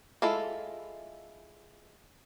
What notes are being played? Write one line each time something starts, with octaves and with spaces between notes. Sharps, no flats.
G#3 E4 F4 A4